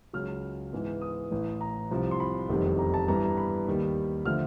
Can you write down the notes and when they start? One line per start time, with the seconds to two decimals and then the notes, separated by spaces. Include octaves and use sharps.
0.13 C#2 C#3 F#3 F6
0.73 G#2 E3 G#3 B3
1.02 D#6
1.31 A1 A2 E3
1.61 A#5
1.91 C2 C3 F3
2.11 C6
2.20 B5
2.49 F1 E2 C3 D#3 G3
2.79 A#5
2.94 A5
3.08 G2 E3 G3 B3 A#5
3.23 A#5
3.38 B5
3.67 D#2 D#3 G3
4.25 D3 F3 A3 F6